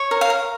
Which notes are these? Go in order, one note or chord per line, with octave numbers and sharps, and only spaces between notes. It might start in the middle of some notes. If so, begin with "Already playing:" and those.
Already playing: C#5
A#4
F5
A#4